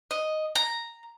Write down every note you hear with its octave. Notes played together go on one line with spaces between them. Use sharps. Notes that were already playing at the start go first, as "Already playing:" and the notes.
D#5
A#5